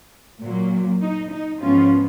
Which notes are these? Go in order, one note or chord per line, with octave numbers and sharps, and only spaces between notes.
A#2 F#3 A#3
D#4
D#4
G#2 F3 B3 C#4 F4